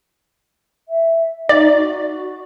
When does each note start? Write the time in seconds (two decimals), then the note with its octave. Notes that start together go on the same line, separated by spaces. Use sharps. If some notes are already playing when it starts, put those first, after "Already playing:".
0.88 E5
1.49 D#4 D5
1.73 F#4